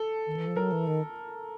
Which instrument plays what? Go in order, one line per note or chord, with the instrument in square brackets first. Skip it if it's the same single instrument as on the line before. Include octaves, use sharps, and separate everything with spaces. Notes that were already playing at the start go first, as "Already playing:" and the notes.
Already playing: [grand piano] A4
[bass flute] D#3
E3
F3
[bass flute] F#3 [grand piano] A#4
[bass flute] E3
D#3